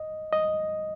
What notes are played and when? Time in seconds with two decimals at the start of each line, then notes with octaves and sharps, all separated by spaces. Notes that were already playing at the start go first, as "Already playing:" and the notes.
Already playing: D#5
0.33 D#5